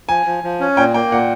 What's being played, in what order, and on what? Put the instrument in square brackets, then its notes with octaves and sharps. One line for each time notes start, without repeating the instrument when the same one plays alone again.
[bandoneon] F3 [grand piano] G#5
[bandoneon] F3
F3
C#4
[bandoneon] A#2 [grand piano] G5
[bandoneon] A#3 [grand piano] G5
[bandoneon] A#2 [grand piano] F#5